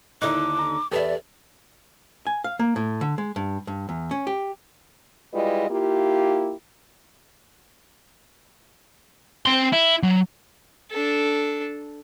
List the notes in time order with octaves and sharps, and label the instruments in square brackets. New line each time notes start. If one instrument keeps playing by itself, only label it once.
[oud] D#2 D3 D#4 [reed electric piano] E4 F#6 [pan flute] D6
[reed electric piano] A#5
[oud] E2 E5 [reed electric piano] G4 A4 B4 [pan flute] D5
[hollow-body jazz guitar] G#5
F5
A#3
A2
D3
G#3
G2
G2
E2
C#4
G4
[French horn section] G3 G#3 E4 F4 B4 D#5
A#3 E4 F4 G4
[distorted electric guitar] C4 C6
E4
F#3
[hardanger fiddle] D4 A4